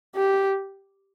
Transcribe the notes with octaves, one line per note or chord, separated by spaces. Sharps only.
G4